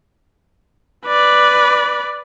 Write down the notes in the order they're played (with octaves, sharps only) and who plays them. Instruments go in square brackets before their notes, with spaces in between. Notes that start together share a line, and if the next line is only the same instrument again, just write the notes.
[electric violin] B4 D5